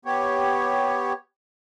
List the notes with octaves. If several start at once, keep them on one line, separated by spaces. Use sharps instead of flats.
B3 G4 C#5